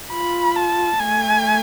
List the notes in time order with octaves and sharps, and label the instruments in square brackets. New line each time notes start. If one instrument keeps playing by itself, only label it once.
[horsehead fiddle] F4 [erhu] B5
[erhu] A5
[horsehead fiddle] A3 [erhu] G#5